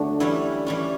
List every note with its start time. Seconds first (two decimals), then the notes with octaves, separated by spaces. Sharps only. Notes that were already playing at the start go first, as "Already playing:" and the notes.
Already playing: D3 F#3 A3
0.20 E3 G3 C#4 E4
0.67 E3 G3 C#4